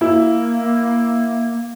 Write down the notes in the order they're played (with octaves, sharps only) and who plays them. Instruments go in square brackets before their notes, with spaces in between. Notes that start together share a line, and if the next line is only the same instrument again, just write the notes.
[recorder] A#3 [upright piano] E4